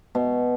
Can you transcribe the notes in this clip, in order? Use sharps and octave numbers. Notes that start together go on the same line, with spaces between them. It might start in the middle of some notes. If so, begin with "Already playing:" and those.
B2